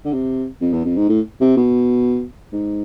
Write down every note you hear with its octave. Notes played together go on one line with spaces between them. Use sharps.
D3
C3
F2
E2
F2
G#2
A2
C3
B2
G#2